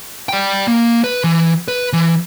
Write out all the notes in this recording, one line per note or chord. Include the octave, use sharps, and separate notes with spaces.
D5 G5
A#3
B4
E3
B4
E3